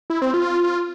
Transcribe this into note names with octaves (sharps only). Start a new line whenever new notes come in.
E4
C4
F4